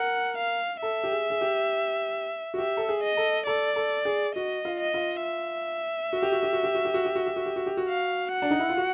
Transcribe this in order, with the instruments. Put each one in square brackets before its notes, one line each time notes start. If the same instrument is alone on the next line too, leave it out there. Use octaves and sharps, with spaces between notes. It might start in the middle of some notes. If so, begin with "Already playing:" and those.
Already playing: [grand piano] A#4 [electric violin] F#5
[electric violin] F5
[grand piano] A4 [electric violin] E5
[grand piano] G4
G#4
G#4
G4
F#4
[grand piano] G4 [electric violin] E5
[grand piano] A4
G#4
[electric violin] D#5
[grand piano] A4
[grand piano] A4 [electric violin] D5
[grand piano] A4
G#4
[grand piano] F#4 [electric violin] D#5
[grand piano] F4
[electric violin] D#5
[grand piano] F4
[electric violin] E5
[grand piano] F#4
G4
F#4
G4
F#4
G4
F#4
G4
F#4
G4
F#4
G4
F#4
G4
F#4
G4
F#4
[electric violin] F5
F#5
[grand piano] D4
D#4
E4
F4
F#4